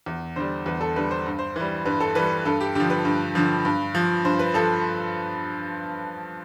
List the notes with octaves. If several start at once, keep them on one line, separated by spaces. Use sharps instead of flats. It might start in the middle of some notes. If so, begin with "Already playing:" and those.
E2
D3 G3 C5
E2 B4
A4
D3 G3 B4
C5
G2
C5
E3 G3
G2 B4
A4
E3 G3 B4
G2 A4
G4
D3 F3 G4
B4
G2
D3 F3
G2
F3
G2 C5
B4
F3 A4